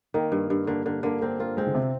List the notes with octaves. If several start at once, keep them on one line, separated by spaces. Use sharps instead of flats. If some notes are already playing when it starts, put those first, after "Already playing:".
D#3 A#3
G2
G2
D3 A#3
D3 A#3
D3 A#3
A#3 C4
A#3 F4
G#3 C4
D3
C3